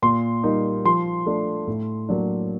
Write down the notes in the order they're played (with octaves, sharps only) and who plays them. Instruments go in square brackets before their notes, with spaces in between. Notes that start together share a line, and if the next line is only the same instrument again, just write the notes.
[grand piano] A#2 C6
G3 A#3 D#4
F3 C6
A3 D4
A2
F#3 A#3 D4